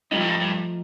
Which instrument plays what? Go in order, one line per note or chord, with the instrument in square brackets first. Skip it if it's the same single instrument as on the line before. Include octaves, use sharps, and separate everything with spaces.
[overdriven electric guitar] G2 [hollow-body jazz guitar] F3 A3 D#4
[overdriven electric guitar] A2
G2
G2